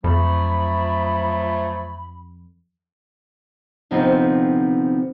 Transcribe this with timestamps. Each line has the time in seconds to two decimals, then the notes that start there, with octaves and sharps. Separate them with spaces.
0.04 F2 F3 F#3 A3 B5
3.91 D2 C3 F3 B3 C4 D#4